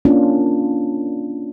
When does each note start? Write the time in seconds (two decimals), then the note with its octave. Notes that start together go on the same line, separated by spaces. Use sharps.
0.05 A#3 C#4 D4 F4